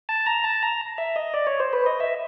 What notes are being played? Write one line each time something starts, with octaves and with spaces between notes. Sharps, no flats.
A5
A#5
A5
A#5
E5
D#5
D5
C#5
C5
B4
D#5
E5